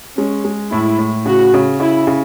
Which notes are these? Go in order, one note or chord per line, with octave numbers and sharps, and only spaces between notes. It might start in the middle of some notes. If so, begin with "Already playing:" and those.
G#3 C#4
G#3
A2 E4
A2
C#3 F#4
C#3
C#3 E4
C#3